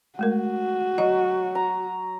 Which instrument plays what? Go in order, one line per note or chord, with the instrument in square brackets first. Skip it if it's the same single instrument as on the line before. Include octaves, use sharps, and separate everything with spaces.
[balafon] G#3 A3 A#4 [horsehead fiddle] F#4
[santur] F#3 [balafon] D#5
[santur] A#5